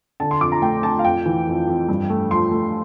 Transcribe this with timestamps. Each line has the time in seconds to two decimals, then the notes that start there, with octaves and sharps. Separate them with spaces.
0.20 D3 A5
0.31 C6
0.41 F2 D6
0.52 A#5
0.62 A3 G5
0.83 F2 A5
0.99 F5
1.04 F2 G5
1.26 E3
1.47 F2
1.67 F2
1.89 G2
2.10 A3
2.31 F3 C6
2.52 A3